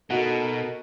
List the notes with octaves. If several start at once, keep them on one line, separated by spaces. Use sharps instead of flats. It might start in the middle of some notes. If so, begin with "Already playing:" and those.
B2 D#4 F#4 A4 A#4